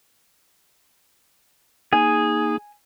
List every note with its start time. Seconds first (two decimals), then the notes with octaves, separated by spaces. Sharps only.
1.93 A#3 D#4 G#4 G#5